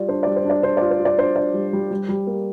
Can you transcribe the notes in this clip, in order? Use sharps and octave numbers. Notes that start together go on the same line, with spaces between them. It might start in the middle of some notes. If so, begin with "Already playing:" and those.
Already playing: G3 F4 D5
D4 C5
G3 D5
C5
D4 D5
D4 C5
F4 D5
C5
F4
D5
D4 C5
D4 D5
G3
G3
G3
G3
A#3